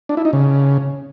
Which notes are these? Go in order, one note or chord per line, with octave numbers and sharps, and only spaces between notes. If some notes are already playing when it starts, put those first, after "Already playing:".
D4
E4
D#4
C#3